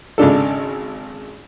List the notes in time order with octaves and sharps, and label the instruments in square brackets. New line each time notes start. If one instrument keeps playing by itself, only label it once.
[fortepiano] G#1 C#3 D4 A4